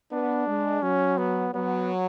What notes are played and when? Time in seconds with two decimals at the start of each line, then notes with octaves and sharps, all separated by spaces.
0.12 B3 D4
0.47 G#3
0.83 F#3 C#4
1.18 B3
1.54 F#3 B3